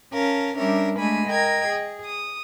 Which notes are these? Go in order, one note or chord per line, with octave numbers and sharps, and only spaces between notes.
C#4 A#4 F5 A5
G3 C#4 D4 A#4 E5
G#3 A3 D4 G#5 B5
A#4 D#5 G5 G#6
G#4
D#6